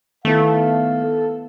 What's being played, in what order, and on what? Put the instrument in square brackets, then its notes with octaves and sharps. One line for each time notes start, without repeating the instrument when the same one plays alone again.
[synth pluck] D#3 B3 E4 [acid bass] A3 [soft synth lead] A4 [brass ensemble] F5